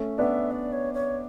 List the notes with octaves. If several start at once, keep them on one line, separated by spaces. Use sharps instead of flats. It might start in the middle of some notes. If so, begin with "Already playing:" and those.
Already playing: A3 C#4
B3 D4 E5
D5
C#5
C#5